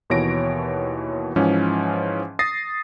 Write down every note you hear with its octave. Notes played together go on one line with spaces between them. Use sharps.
D#2 B2 E3 C#5 A#6 D7
G#2 E3 F3 C#4
D#6 A6 A#6 C7